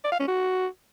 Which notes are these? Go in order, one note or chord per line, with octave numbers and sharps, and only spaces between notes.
D5
F5
C#4
F#4